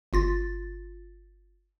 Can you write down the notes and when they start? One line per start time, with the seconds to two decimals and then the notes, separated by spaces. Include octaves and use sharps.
0.13 G1 F4 A6